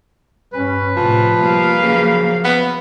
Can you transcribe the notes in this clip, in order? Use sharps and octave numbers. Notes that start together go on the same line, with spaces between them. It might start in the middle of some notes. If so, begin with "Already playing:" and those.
G2 C#4 B4
F1 A2 F3
G3 A#3 F5
C#3 F3 F#3
B3